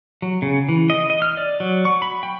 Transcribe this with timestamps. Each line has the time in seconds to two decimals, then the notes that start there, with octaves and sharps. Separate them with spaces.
0.22 F#3
0.42 C#3
0.69 E3
0.90 D#5
1.10 D#5
1.22 F6
1.37 D5
1.60 F#3
1.85 C#6
2.02 B5
2.23 G5